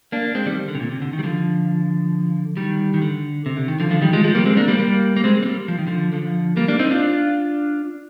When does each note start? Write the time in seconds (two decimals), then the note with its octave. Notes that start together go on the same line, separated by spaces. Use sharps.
0.12 A#3 D4
0.35 G#3 C4
0.46 D#3 G3
0.68 D3
0.75 C3
0.80 A#2
0.91 C3
1.02 D3
1.13 D#3
1.19 G3
1.23 D3 F3
2.57 D#3 G3
2.94 D#3
3.02 D3
3.46 C3
3.57 D3
3.68 D#3
3.80 D3 F3
3.91 D3 F3
4.02 D#3 G3
4.13 F3 G#3
4.24 F3 G#3
4.35 G3 A#3
4.46 G#3 C4
4.57 A#3 D4
4.68 G3 A#3
4.79 G3 A#3
5.17 A#3
5.24 G#3 C4
5.43 C4
5.46 G3 A#3
5.68 F3
5.79 D#3
5.87 D3 F3
6.13 D3 F3
6.57 G3 A#3
6.68 A#3 D4
6.79 C4 D#4
6.91 D4 F4